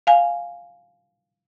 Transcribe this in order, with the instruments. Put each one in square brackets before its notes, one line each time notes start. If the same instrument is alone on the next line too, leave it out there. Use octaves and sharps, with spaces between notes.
[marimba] F5 G#5